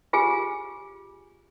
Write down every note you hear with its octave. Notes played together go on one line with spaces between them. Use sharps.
F4 G4 G#4 G#5